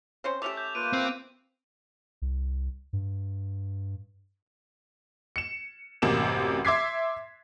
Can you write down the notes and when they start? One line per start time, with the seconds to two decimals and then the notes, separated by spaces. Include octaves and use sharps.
0.24 C4 C#4 C5
0.42 A3 C#4 G4 E5 D6 F7
0.57 G6
0.75 A#3 F4 B4 D7 D#7
0.93 C4
2.22 C2
2.93 G2
5.36 C#7 E7
6.02 A1 F#2 C3 A#3 E7
6.65 E5 C6 D6 G#6 B6 C7